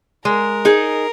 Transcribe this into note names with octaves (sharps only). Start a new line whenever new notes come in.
G#3 A#4
D#4 G#4